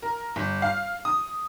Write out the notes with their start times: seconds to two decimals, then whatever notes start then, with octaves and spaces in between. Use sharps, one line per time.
0.02 A#4
0.36 G1
0.62 F5
1.05 D#6